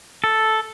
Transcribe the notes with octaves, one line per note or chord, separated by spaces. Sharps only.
A4